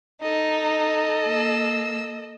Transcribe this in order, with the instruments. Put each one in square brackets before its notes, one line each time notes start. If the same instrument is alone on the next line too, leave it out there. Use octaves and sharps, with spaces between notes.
[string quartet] D#4 [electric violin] A4 D#5
[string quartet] A#3 E6